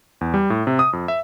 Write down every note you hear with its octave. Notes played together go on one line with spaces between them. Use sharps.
E2
G3
A2
C3
D#6
F2
E5